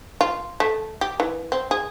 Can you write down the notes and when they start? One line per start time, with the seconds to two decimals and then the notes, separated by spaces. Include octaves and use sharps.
0.21 F4
0.60 A3
1.01 G4
1.20 E3
1.52 C4
1.71 G#4